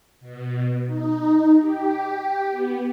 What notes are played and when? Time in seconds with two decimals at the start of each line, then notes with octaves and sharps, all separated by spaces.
0.21 B2
0.86 D#4
1.59 G4
2.51 B3